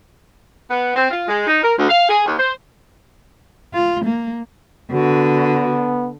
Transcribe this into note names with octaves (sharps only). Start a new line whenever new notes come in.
B3
C4
F4
G#3
D#4
A#4
D2
F5
G#4
D#2
C5
F4
A#3
D3 B3 F#4